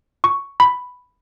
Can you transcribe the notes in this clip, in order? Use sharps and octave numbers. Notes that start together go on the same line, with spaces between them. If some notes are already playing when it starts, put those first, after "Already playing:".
C#6
B5